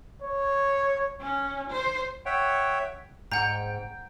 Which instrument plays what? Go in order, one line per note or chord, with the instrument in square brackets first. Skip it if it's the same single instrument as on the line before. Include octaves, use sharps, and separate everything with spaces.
[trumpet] C#5
[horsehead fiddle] C#4
C5
[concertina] C#5 E5 F#5 G5
[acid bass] G#2 [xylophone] F#5 A#5 [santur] G5